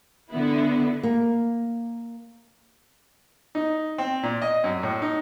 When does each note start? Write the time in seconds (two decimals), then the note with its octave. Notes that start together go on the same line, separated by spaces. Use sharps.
0.31 D3 B3 E4
1.03 A#3
3.55 D#4
3.98 C4
4.23 A#2
4.42 D#5
4.64 F#2
4.83 A2
5.02 D#4